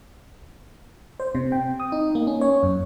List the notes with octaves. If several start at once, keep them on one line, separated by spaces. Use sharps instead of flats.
C5
C3
G5
D#6
D#4
A#3
C#4
C#5
F#2